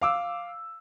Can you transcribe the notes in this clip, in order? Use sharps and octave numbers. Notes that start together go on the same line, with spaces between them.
F5 D6 E6